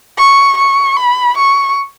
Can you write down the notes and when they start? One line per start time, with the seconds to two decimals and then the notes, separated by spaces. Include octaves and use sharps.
0.18 C#6
0.57 C#6
0.96 B5
1.38 C#6